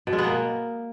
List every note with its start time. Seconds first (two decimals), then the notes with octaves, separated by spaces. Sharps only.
0.07 B2
0.13 G#3
0.18 B3
0.24 A#3